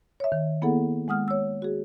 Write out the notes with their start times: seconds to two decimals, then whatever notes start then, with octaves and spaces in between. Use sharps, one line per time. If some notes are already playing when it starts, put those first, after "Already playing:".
0.20 C#5 E5
0.32 D#3
0.62 A#3 B3 E4 G#4 A4 F#5
1.08 G#3 F#5 D#6 F6
1.28 C#5 E6
1.62 F#4 G#4